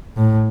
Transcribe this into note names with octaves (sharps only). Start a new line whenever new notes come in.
A2